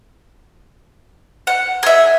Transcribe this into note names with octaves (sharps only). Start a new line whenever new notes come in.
F#5
G#4 E5